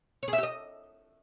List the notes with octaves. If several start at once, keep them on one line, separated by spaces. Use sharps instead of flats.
C#5
G#4
E5
G4
D#5